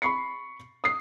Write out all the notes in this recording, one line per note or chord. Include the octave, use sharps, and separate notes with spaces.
B5 C#6 C7 C#7
D#6 C7